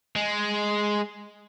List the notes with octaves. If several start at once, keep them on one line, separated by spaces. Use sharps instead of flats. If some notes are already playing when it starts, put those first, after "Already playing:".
G#3